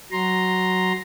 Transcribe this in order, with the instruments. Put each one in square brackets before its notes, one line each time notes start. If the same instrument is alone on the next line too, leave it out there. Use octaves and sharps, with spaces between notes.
[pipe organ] F#3 A#5 C6